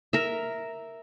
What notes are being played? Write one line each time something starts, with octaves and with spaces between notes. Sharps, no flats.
A#4 E5